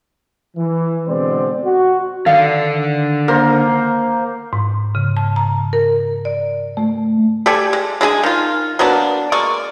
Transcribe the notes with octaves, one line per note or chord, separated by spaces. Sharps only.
E3
B2 D3 G#3 C4 C5 D5
F#4
D3 D#3 A4 D5 F5
A#3 A#4 C5
G#2
C#3
A5
A#5
A#4
D5
A3
G4 A4 D5 G#5
G#3
G#3 D4 G#4 G#5
D#3 F4
F#3 A#3 B3 D4
G#3 A#3 D5 C#6